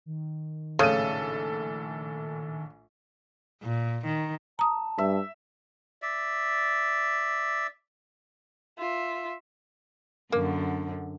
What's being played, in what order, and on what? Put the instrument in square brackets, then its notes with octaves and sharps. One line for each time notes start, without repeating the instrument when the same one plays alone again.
[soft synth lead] D#3
[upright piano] A#1 A2 D#7 [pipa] C#3 [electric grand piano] A4
[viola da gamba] A#2
D#3
[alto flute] A5 [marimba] A#5 D#6
[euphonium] G2 [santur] E5
[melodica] D5 E5
[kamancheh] F4 E5
[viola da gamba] F#2 D3 [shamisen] A#3